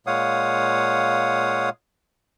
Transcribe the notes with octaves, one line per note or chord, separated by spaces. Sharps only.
A#2 G#3 C#5 F5 F#5 D#6